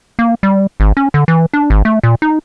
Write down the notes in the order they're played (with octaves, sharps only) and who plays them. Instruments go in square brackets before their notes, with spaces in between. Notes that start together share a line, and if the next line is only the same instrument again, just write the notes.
[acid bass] A#3
G3
G#1
C#4
D3
E3
D4
G#1
A3
A#2
D#4